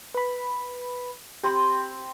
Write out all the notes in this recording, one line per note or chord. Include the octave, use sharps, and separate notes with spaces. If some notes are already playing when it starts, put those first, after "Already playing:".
B4 B5
C4 G4 B5 C6